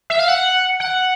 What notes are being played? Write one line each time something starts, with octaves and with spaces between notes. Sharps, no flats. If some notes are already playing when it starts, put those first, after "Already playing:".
E5
F5
F#5
F#5